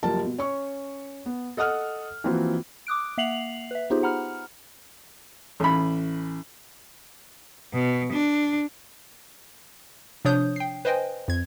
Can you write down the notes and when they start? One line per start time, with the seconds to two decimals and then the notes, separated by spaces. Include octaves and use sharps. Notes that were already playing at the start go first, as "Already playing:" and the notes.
0.03 F#1 F3 G3 A#4 A5
0.25 B2
0.38 C#4 C#5 C#6
1.26 B3
1.57 A4 D#5 F#5 D#6 F6
2.24 E3 F3 A#3 C4 F4 F#4
2.87 D6 D#6 F#6 D7
3.18 A#3 E5 F#5 C7 F7 F#7
3.71 B4 E5
3.90 B3 D#4 F4 G4 G#4 C5
4.03 F#5 A#5 B5 F6
5.60 A1 B5
7.73 B2
8.12 D4
10.25 C3 F3 D4 C#5 D#6 G6
10.56 G5 C7
10.85 B4 C5 D#5 G5 G#5
11.28 F2 G#6